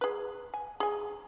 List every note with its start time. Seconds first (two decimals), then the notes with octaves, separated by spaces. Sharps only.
0.01 G#4 B4
0.54 G#5
0.80 G#4 G#5